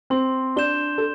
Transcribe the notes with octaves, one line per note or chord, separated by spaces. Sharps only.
C4 C6
D4 G6 E7 G7
A4